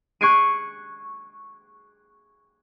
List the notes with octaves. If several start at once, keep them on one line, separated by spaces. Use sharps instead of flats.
C#6 F#6 G#6 C7 D7 D#7